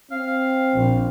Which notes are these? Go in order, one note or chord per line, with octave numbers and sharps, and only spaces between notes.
C4 F5
A#1